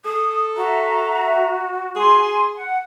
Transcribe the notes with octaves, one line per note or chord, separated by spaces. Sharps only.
A4 D#6
F#4 E5 A#5
G#4 G#5 C6
F#5